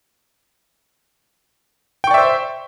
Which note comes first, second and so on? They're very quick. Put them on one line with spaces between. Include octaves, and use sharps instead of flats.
G5 C#6 D5 E5 C5